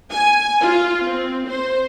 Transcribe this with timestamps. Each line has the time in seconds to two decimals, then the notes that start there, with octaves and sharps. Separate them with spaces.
0.13 G#5
0.61 F4
1.04 C4
1.48 C5